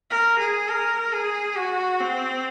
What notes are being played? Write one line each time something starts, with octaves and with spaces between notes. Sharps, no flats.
A#4
G#4
A#4
G#4
F#4
C4